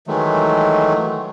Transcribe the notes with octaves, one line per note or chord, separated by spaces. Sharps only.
D#3 E3 F#3 G#3 A3